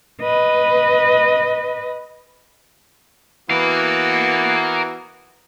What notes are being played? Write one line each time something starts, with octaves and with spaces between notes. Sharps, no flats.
B4 D#5
E3 B3 F#4 A#4 F5